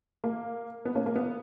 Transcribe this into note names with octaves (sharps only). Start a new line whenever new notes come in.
A#3
B3
A#3 C#4
A#3
B3